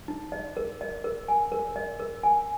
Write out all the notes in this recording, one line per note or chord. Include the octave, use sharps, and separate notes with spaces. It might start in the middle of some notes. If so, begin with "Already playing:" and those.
D#4
D#5
A#4
D#5
A#4
G#5
A#4
D#5
A#4
G#5